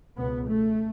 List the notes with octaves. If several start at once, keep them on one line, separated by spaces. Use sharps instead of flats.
C#2 B2 B3
A3